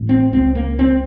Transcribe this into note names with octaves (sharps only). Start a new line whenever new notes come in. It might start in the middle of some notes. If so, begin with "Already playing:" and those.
Already playing: A1 A2
C4
C#2 C#3 C4
A#3
C4